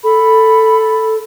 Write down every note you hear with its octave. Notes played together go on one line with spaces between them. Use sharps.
A4 B5